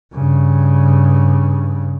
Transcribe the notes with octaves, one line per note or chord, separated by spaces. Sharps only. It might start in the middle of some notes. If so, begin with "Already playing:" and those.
G2 C#3